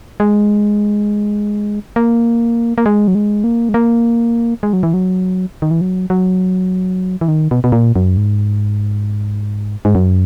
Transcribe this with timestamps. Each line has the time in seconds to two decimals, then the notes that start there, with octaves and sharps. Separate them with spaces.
0.20 G#3
1.96 A#3
2.78 A#3
2.86 G#3
3.08 F#3
3.15 G#3
3.44 A#3
3.69 G#3
3.74 A#3
4.63 G#3
4.73 F#3
4.83 E3
4.94 F#3
5.62 D#3
5.71 E3
5.81 F#3
6.10 F#3
7.21 E3
7.28 D#3
7.51 B2
7.64 B2
7.72 A#2
7.96 F#2
8.17 G#2
9.85 G#2
9.95 F#2